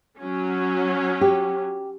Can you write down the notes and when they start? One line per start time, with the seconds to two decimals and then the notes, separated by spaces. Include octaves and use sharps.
0.20 F#3 C#4
1.21 G4